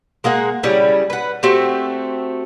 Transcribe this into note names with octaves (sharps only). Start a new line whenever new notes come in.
G#3 A#3 G#4 F#5
C#3 G3 C#4 E4
B4 F#5
A3 C4 F#4 G4